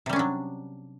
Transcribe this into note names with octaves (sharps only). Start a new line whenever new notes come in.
C3 F#3 G3 C#4 D4